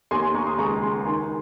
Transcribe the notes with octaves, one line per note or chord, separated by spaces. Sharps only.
D#2 G#5 C6
G#5 C6
D#2 A#5 C#6
C6 D#6
C#2 A#5 C#6
C#2 G#5 C6
D#3 G#5 C6